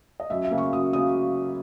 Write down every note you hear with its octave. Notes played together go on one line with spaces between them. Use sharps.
D#5
F#2 E5
E5
C#3 F#3 A#3
C#6
F#2 D#6
C#3 F#3 A#3 D#6